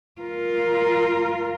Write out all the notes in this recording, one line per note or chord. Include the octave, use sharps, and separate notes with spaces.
F4 A#4